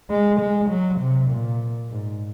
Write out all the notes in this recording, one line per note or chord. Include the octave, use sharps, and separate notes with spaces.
G#3
G#3
F#3
C3
A#2
G#2